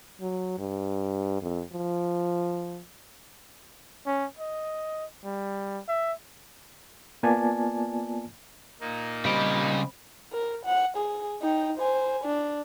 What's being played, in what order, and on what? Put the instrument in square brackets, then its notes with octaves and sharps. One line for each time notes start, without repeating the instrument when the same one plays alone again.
[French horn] F#3
G2
F2
F3
[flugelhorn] C#4
D#5
G3
E5
[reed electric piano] A#3 B3 F4 D5 G#5 A5
[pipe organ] A#2 A#3 D#4
[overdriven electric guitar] C#3 D#5 [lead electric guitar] G3 [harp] C4 B5 D7
[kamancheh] A#4
F#5
G#4
D#4 G5
C5 G#5
D4